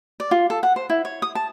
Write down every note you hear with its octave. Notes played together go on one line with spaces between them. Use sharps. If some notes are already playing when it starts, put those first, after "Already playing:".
D5
F4
A4
F#5
C5
E4
C#5
D#6
A5